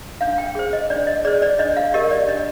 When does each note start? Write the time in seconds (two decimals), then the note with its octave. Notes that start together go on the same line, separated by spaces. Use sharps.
0.21 D4 F5
0.38 G5
0.55 G#4 C5
0.73 D#5
0.90 D4 D5
1.07 D#5
1.25 G#4 C5 D5
1.42 D5
1.59 D4 D#5
1.77 F5
1.94 G4 A#4 D#5
2.11 D5
2.28 D4 D#5